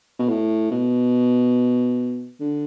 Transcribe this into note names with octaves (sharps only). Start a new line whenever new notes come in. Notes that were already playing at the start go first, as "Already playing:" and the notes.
B2
A2
B2
D3